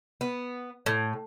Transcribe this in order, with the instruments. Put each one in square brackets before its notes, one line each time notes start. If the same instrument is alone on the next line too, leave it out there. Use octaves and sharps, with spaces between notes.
[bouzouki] B3
A2